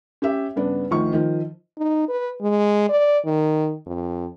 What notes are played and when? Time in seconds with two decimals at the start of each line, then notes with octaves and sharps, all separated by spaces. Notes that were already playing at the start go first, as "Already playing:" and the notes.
0.22 C#4 G4 E5
0.56 G2 C#3 B3 D4
0.91 D2 D#3 F3 C#6
1.13 D#3 F3
1.78 D#4
2.08 B4
2.41 G#3
2.89 D5
3.25 D#3
3.86 F2